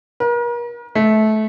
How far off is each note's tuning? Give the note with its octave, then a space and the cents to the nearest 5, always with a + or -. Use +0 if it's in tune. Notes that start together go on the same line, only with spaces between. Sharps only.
A#4 +40
A3 -20